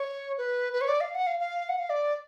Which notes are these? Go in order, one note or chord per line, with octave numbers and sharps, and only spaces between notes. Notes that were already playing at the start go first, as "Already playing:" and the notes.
Already playing: C#5
B4
B4
C#5
D5
F5
F#5
F5
F5
F#5
F5
D5